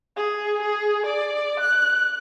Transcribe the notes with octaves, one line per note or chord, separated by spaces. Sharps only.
G#4
G#4
D5
F#6